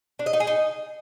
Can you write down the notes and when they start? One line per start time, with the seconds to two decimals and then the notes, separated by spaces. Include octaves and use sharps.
0.19 D4
0.26 D#5
0.33 D#4
0.40 G#4
0.47 D#4